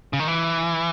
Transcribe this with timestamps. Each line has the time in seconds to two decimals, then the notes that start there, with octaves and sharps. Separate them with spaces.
0.13 C#3
0.20 D#3
0.28 E3